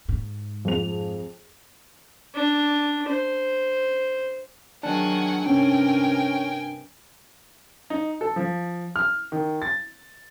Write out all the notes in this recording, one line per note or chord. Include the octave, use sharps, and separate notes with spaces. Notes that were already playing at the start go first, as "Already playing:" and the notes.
G#2
F2 G#4 F7
D4
C5
D#3 F#3 D4 G#4 F#5 G#5
G2 C3 C#4 A#4 G5 G#5
D#4
A4
F3
F6
D#3
A6